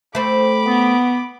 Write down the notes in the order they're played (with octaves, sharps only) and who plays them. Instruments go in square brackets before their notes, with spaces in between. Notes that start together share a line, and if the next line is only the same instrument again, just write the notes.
[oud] A3 C4 [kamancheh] B5 D6
[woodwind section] B3